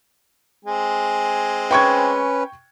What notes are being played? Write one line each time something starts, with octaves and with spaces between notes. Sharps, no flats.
G#3 C4 G#5
C#4 B4 G5 C#6 G#6